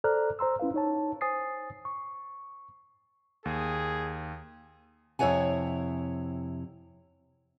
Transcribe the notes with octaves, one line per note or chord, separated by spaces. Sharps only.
A4 C5 D5 A#5 F6 F#6
C5 A#5 C6 E6
C#4 E4 B4 F5
D#4 C#5 A5
C5 G#5 D#6 A6 C7
C#6
D#2 G#4
F2 C3 E4 C#5 F#5 G#5